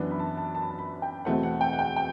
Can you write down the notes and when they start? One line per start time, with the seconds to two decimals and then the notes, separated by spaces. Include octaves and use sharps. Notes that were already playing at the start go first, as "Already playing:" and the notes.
Already playing: F#2 E3 B3 D4
0.11 B5
0.20 A5
0.37 A5
0.55 A5
0.62 B5
0.70 A5
0.79 B5
1.02 G5
1.25 E2 B2 A3 C4 E4 F#5
1.43 F#5
1.61 G5
1.73 F#5
1.79 G5
1.97 G5